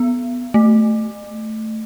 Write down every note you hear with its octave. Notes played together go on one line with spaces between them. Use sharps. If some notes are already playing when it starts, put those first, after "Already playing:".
Already playing: B3
A3